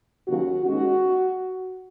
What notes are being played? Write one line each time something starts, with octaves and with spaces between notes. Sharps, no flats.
D#2 C#3 F#3 F#4
D#2 D#3 G#3 C#4 F#4